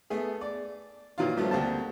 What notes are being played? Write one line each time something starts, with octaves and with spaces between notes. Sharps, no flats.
A3 B3 G#4
D5
A#2 D#3 E3 F#3 F4
G2 F3 F#3 A3 B3
D2 A#3 C4 G4 A5